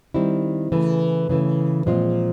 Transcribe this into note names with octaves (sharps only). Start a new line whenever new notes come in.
D#3 G3 C4 E4
C#3 E3 A3
C#3 E3 A3
A#2 F3 G#3 C4 F4